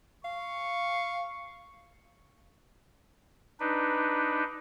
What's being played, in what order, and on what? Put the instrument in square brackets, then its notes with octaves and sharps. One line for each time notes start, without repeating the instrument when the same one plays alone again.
[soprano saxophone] F5 [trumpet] C#6
[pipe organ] D4 D#4 B4